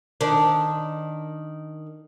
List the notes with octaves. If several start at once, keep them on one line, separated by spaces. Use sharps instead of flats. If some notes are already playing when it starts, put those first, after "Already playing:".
D#3 D4